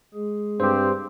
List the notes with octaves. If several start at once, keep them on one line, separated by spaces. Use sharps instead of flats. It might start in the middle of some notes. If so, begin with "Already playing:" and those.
G#3 G#4
G2 C4 G4 C5